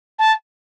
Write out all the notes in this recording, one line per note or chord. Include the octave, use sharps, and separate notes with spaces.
A5